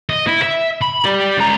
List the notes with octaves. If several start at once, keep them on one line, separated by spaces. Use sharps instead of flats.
D#5
E4
E5
B5
G4 D5
C#2 A#5